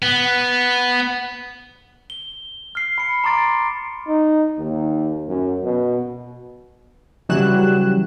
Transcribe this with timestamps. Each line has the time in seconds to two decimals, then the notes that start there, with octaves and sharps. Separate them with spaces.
0.02 B3
2.10 G7
2.75 F6 C7
2.98 B5 C#7
3.24 A#5 C6 D6 A6 D7
4.07 D#4
4.58 D#2
5.28 F#2
5.63 B2
7.29 C#3 E3 F#3 G3 F#6 E7